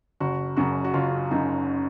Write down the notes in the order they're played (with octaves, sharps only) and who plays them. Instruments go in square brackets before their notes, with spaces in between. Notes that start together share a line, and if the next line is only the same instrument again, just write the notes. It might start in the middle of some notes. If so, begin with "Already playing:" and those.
[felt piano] F#1 F#4
F#2 C#3 F#4
F#4
F#1 F4
F#2 C#3 D#4